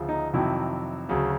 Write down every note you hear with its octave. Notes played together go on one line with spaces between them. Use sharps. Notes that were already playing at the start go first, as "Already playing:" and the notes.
Already playing: D2 C#3 F3
D#4
F2 C3 D#3 F#3 E4
D2 C#3 F#3